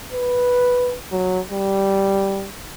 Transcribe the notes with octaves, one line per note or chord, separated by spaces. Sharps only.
B4
F#3
G3